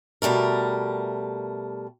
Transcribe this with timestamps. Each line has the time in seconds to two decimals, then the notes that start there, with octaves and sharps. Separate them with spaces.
0.22 B2 G3 A3 A#4